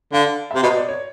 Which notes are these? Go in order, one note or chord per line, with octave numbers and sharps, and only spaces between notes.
D3 F5
C3 E5
B2 D#5
D5
C#5